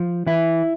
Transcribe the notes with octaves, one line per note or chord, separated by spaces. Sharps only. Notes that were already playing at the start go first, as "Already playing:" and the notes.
Already playing: F3
E3 E4